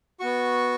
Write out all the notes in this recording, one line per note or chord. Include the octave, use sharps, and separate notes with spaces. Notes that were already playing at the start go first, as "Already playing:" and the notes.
B3 F#4 C#6